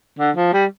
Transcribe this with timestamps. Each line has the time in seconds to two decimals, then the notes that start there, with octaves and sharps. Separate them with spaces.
0.19 D3
0.36 F3
0.53 G3